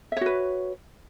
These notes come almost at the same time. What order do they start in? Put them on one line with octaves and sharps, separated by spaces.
E5 C#5 F#4 B4